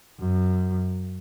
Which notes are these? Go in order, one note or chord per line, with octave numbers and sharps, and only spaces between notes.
F#2